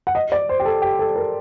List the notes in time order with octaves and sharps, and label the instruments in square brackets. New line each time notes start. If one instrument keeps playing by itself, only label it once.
[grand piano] F#5
D#5
D5
C5
G4
A4
G4
A4
A#4